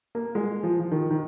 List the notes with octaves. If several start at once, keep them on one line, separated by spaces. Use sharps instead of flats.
A#3
G#3
F3
F3
D#3
D#3